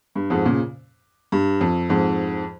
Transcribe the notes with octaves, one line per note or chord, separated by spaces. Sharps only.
G2
F2 G#2
A#2 C#3
G2
F2
F2 G#2